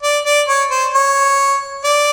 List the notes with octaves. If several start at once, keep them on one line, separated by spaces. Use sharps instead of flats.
D5
D5
C#5
C5
C#5
D5